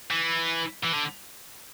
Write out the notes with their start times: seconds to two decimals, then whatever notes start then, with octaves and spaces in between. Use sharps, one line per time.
0.11 E3
0.83 E3
0.93 D3